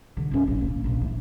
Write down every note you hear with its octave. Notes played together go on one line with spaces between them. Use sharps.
D3
D#1 C#4
A#1 E4
A#3
A#1 G#3
E3